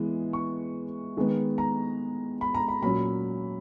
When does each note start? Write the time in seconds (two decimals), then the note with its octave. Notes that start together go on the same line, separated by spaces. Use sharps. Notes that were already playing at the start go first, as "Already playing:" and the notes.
Already playing: E3 G#3 B3
0.33 C#6
1.17 D#3 G#3 B3
1.58 A#5
2.41 B5
2.55 A#5
2.68 B5
2.82 A#2 F#3 C#4 B5